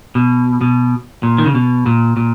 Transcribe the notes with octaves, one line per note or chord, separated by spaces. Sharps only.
B2
B2
A#2
D#3
C#3
B2
A#2
A#2